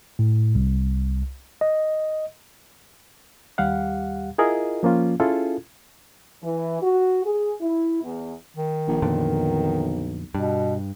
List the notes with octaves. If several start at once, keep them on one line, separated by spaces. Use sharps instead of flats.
A2
C2
D#5
D#2 G3 G4 F5 F#5
E4 F4 G#4 A#4 D#5
F3 A#3 C#4 F4
C#4 E4 F4 G#4 A4
E3
F#4
G#4
E4
E2
D#3
A#1
B1 F2 A#2 D3
G2 B2